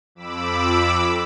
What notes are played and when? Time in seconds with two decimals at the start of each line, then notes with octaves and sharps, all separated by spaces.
0.15 F2 B5 D6 E6